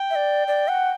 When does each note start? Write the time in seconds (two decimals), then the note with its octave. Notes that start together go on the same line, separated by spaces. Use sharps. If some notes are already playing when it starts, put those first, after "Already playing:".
Already playing: G5
0.10 E5
0.15 D5
0.48 D5
0.68 F#5